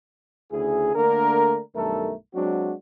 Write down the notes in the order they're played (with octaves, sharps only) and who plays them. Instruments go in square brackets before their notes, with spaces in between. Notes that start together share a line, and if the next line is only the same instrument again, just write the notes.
[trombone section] D2 C#3 E4 G#4
D3 A3 A#3 D4 A#4
B1 G2 D#3 A3 A4 A#4
F#3 G#3 C4 D4 F#4